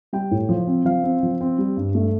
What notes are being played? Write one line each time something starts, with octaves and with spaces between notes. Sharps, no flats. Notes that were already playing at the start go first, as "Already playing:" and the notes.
G3 G5
A2
F3
C4
F3 F5
C4
F3
C4
G3
G2
A3